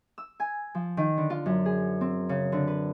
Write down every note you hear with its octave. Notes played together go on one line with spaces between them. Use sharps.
E6
G#5
F3
D#3
D3
F4
F#2
G#4
C4
C#3
D3
B4